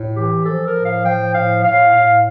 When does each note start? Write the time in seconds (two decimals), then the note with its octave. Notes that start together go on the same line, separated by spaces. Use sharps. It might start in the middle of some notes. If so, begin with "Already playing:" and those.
Already playing: A2
0.16 E3 G4
0.45 F3 A4
0.66 A#4
0.76 A2
0.85 F5
1.05 F3 G5
1.34 A2 F5
1.63 A2 F5
1.93 A2